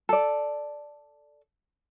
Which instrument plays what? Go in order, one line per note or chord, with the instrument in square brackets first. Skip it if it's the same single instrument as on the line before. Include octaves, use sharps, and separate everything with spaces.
[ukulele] A4 D5